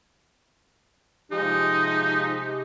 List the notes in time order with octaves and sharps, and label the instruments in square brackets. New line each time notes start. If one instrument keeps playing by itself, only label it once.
[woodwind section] C3 G4 [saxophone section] F3 G#3 [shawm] D#4